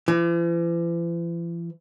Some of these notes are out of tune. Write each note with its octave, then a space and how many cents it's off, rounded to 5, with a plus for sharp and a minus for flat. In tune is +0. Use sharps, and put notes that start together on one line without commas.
E3 +45